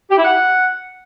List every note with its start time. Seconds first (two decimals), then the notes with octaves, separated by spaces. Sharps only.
0.10 G4
0.17 E4
0.24 F#5